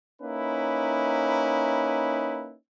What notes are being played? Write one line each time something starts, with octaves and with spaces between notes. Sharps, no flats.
A#3 C#4 D#4 E4 B4